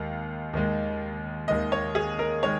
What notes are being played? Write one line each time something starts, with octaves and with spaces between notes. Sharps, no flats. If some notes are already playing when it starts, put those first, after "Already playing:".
Already playing: D#2 D#3 G#3
D#2 D#3 G#3
D#2 D#3 G#3 D#5
C#5
G#4
A#4
D#3 G#3 C#5